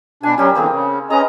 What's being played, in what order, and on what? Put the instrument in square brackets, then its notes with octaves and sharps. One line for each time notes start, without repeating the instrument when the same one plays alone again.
[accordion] B2 D4 [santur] G#5
[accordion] F#3 C#4 [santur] G3 G4 A#4
[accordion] B2 D3 E3 [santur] A#3 C4 G#4
[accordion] C#3
[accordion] C#4 D#5 A#5 [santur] G#4 B4